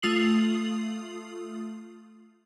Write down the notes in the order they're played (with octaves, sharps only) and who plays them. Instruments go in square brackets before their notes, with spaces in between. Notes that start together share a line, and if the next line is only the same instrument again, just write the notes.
[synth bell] A3 F4 D#6 C7 F#7